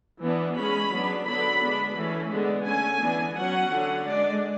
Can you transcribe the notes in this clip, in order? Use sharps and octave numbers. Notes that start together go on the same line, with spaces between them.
E3 B3 D4
G#3 C#4 B5
F#3 B3 D4
D3 F#3 B3 D4 B5
G#3 B3 D4
E3 A3 C#4
D3 G#3 B3 D4
D3 A3 C#4 G#5
E3 B3 D4
F#3 C#4 F#5
D3 F#3 C#4
G#3 D4 D5